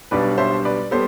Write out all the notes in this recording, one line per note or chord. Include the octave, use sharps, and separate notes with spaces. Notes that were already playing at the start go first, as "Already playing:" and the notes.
B1 B2 G3 D4 B4 D5
C5 E5
B4 D5
G3 B3 A4 C5